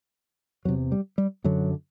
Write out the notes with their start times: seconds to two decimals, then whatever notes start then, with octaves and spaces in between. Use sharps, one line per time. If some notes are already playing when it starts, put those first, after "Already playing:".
0.65 E2 F#3
0.68 C3
0.92 G3
1.18 G3
1.44 F#2 D3 F#3